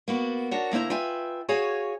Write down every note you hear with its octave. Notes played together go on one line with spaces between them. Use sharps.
A#3 B3 F#4
D4 F#4 A#4 C#5
D2 A#3 E4 C5 A#5
F4 B4 E5 G5 G#5
F#4 G#4 C#5 F5 G#5